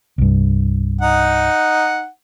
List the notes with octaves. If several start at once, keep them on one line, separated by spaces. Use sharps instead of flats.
C2 G2
D#4 F#5